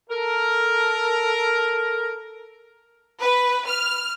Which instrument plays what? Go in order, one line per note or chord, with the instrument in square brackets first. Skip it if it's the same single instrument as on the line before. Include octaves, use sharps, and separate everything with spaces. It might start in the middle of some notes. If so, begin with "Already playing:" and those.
[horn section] A4 A#4
[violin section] B4
F6